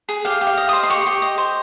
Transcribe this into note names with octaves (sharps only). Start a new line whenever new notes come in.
G#4
G4 F5
G4
F5
D#5
C5 D#6
C6
G4 C#6
G4
D#5
C5